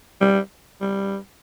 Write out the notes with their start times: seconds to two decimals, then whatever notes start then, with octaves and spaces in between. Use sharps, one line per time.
0.21 G3
0.81 G3